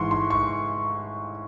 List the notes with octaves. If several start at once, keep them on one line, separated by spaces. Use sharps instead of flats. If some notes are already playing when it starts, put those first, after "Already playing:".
Already playing: G#2 E3 C6 C#6
C6
C#6